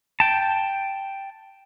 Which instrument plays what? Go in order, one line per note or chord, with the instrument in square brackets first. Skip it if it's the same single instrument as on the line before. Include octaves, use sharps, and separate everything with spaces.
[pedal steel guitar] G5 A5